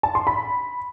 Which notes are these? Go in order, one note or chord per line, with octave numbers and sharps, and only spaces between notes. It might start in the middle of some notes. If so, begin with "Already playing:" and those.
A5
C6
B5